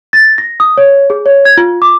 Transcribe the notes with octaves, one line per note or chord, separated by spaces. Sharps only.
A6
A#6
D#6
C#5
G#4
C#5
G#6
F4
D6